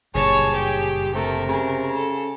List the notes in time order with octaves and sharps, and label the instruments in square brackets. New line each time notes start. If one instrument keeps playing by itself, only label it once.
[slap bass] F#1 A#2 [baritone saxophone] G2 [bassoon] G#4 [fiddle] C#5 A5
[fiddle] G4
[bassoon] C3 [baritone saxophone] A3 [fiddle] A#4
[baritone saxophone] C#3
[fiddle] A4